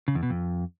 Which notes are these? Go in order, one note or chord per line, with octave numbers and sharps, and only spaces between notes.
C#3
E2
B2
F2